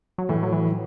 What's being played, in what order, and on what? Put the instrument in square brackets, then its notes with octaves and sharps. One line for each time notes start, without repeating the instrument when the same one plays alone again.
[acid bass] F#3
[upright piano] A2 [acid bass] E3
[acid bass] F#3
E3